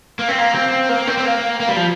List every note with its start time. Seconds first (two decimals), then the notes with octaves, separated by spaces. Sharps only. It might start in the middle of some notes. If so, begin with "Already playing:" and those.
0.19 A#3
0.28 C4
0.39 A#3
0.55 C4
0.89 A#3
1.07 C4
1.18 C4
1.25 A#3
1.60 A#3
1.68 G3
1.76 F3